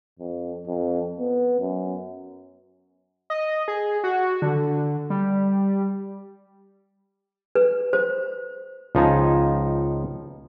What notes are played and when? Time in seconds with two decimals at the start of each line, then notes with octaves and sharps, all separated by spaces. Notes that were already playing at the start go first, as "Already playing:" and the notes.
0.19 F2
0.67 F2
1.18 B3
1.59 F#2
3.30 D#5
3.68 G#4
4.04 F#4
4.42 D3
5.10 G3
7.55 B4
7.93 C5
8.95 C#2 F3 D#4 G#5 A5